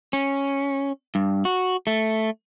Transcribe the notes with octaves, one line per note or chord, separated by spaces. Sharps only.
C#4
G2
F#4
A3